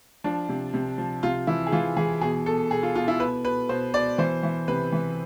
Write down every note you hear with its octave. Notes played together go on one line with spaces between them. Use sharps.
F3 D4
C3
C3
F3
C3 F4
E3 E4
G#4
E3 F4
E3 G#4
B2 G#4
B2 A4
B2 G#4
F4
B2 F4
E4
B2 B4
B2 B4
B2 C5
B2 D5
E3 C5
E3
C3 B4
E3